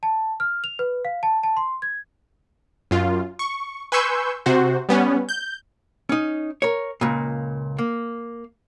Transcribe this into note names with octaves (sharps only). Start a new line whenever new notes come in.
A5
F6
F7
B4
F5
A5
A5
C6
G#6
F#2 F4
C#6
B4 G#5 C6 C#6 E6 G6
C3 F#4 C5
G3 B3 C#4
G6
C#4 D#4
A#4 C#5
C#2 A#2
A#3